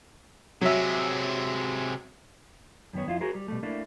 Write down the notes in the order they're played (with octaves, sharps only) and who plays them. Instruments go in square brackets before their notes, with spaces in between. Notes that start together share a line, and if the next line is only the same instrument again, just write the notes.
[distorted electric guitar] C3 G#3 [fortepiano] F#3 E5
[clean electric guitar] F#2 D#3 B3 C#5
F2 E4 F4
F#4 G#4 A#4 C5
G3
B2 G3 A3
A3 A#3 D4 E4